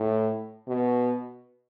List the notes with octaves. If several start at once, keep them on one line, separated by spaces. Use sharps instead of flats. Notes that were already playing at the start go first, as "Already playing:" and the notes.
Already playing: A2
B2